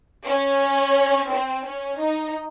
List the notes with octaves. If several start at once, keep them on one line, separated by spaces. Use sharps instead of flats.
C#4
C4
C#4
D#4